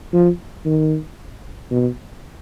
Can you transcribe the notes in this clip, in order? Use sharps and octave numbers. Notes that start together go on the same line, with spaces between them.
F3
D#3
B2